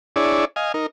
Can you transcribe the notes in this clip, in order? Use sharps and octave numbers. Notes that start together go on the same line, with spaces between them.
D4 E4 G#4 C#5 D5
D#5 F5 G#5
D#4 A#4